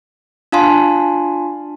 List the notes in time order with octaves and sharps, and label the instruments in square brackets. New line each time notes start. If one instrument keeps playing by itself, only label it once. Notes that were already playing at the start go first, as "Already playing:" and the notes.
[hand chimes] D4 F4 F5 G#5 A5 C6